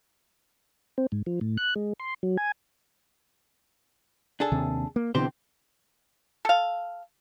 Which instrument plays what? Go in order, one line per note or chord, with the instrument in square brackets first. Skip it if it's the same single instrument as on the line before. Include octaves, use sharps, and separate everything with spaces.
[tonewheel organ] C4
G#2
F3
A2
F#6
G#3
C6
F#3
G#5
[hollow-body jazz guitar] D4 G#4 A4
[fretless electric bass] D#2 C3
A#3
[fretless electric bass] B2 D3 E3 [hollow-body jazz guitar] C4 G4 C5
[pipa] A4 F5